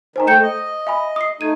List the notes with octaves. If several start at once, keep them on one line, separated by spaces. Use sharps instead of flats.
D#3 C5 G#5 A#5
A3 G5 G6 C#7 E7
D#5
E5 G#5 B5
D#6 C7
A3 D#4 G#6 D#7